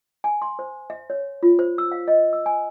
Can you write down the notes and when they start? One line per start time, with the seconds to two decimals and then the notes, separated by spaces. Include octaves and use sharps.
0.24 G#5
0.42 C6
0.59 C5
0.90 E5
1.10 C#5
1.43 F4
1.59 C5
1.78 E6
1.92 F5
2.08 D#5
2.33 E6
2.46 G#5